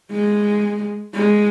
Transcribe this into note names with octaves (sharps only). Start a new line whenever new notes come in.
G#3
G#3